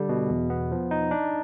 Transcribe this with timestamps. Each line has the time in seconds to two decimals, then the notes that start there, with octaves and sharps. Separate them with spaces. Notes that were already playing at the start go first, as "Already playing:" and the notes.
Already playing: D3 G3
0.09 B2
0.30 E2
0.50 B3
0.71 F3
0.91 D#4
1.11 D4